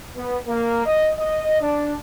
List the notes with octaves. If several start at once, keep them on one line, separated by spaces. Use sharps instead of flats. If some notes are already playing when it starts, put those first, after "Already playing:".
B3
A#3
D#5
D#5
D4